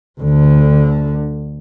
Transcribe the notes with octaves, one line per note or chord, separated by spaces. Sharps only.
D2 D3